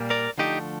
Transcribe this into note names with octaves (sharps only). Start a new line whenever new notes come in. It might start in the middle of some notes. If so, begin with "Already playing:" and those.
Already playing: A#2 G3 A#3
A#4 D5
D3 F3 A3 D#4 G4